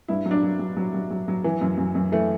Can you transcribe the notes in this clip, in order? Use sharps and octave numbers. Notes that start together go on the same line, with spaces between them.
G2 E4
F#3
D4
F#3
F#3
F#3
F#3
F#3
F#3
E3
F#2
F#2
F#2
E3 A3